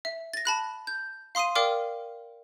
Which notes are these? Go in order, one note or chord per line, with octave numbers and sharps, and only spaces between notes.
E5
A6 A#6
A5 B5 F#6
G6
F5 C6 D#6 C7 D#7
A#4 D5 F5 G5 D6 F6